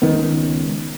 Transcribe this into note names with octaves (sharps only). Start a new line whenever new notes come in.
C#2 D#3 B3